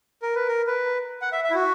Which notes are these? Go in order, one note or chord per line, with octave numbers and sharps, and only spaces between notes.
A#4
B4
A#4
B4
F#5
E5
E5
E4
F#4